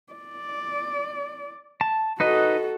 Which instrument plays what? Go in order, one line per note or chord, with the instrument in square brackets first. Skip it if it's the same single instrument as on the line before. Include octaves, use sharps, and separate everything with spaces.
[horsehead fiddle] D5
[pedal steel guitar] A5
[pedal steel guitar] D#4 B4 D#5 [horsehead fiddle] F#4 A4